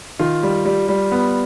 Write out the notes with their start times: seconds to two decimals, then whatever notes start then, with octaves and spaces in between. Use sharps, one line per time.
0.19 D#3 F4
0.43 G3
0.65 G3
0.89 G3
1.12 B3